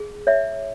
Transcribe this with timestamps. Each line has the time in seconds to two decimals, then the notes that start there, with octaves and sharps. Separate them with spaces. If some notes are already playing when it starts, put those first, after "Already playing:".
Already playing: G#4
0.27 C#5 E5